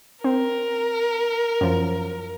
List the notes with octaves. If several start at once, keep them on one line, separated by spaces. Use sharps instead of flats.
C4 A#4
F#2 F3